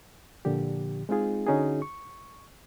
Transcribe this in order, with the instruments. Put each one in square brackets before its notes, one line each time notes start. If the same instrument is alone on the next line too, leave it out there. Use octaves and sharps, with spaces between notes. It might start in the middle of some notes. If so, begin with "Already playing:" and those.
[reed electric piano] A#2 D3 F3 G4
G#3 C4 D#4 F4 G#4
D3 C#4 D#4 F#4 G#4
C#6